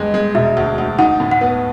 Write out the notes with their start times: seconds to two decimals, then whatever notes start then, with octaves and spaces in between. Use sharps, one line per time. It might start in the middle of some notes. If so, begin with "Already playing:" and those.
Already playing: G2 G#3 D#5
0.14 G#3
0.35 E1 E5
0.57 D2
0.78 D2
0.98 D#4 F#5
1.20 A2
1.31 F#5
1.41 B3